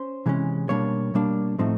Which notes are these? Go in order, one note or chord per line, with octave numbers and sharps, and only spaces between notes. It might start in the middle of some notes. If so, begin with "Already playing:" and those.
Already playing: C#4 C5
C3 E3 G#3 C#4
B2 G3 A#3 D4 C#5
B2 G3 A#3 D4
A2 F3 A3 C4 D#4